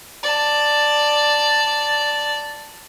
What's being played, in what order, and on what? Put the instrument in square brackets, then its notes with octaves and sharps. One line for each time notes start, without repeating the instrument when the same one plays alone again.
[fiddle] D5 A5